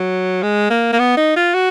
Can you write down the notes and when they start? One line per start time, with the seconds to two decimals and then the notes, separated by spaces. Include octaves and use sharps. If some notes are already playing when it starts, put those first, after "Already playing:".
Already playing: F#3
0.43 G#3
0.70 A#3
0.93 A#3
0.99 B3
1.17 D#4
1.36 F4
1.54 F#4